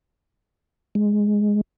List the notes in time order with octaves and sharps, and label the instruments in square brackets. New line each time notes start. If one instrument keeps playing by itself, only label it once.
[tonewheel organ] G#3